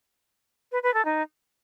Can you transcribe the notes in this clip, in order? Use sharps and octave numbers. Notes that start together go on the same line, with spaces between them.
B4
B4
A4
D#4